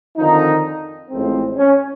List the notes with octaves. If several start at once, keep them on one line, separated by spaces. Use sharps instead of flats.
F2 D3 D#3 F3 D#4
A1 A2 F3 G#3 C4
C#4